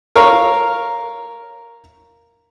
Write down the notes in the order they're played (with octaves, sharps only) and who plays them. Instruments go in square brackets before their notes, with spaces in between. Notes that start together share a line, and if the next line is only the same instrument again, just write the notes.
[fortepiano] A#4 C#5 F5